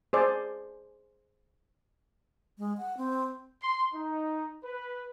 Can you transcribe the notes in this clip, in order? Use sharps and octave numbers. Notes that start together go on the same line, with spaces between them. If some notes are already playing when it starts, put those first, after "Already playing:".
G#4 C5 D5
G#3
F#5
C4
C6
D#4
B4